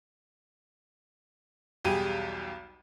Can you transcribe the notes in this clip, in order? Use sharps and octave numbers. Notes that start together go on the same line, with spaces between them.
B1 E2 G3 G4 G#4 D#7